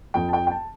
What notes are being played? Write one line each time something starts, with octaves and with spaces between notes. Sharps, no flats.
F2 G5
A5
G5
G5
A5